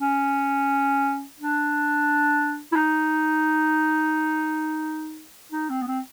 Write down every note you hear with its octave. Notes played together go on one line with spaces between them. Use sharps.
C#4
D4
E4
D#4
D#4
C4
B3
C4